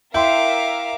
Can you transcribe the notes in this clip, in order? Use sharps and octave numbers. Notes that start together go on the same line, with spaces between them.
E4 A#4 E5 F5 G5 C6 D6